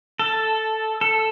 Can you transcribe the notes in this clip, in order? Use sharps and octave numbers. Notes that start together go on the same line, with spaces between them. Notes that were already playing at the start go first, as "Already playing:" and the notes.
A4
A4